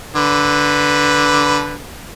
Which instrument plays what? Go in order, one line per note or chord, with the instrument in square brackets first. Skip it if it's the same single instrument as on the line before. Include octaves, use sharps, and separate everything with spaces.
[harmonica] D3 B4